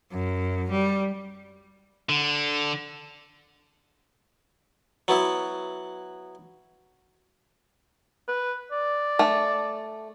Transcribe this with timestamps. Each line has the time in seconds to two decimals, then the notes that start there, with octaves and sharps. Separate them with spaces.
0.11 F#2
0.70 G3
2.09 D3
5.08 F#3 B3 E4
8.28 B4
8.72 D5
9.19 A3